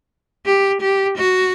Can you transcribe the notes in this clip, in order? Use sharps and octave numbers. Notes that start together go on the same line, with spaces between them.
G4
G4
F#4